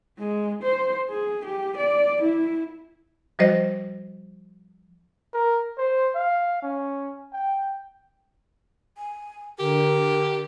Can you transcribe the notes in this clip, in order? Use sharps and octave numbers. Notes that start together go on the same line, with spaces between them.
G#3
C5
G#4
G4
D5
E4
F3 G3 F#4 C5 D#5 A#6
A#4
C5
F5
C#4
G5
G#5
D3 G4 A#4